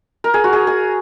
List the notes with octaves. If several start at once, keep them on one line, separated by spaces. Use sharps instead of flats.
A#4
G#4
F#4
G#4
G#4